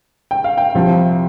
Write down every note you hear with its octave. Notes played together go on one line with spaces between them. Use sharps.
G5
F5
G5
C2 C3 F3 C4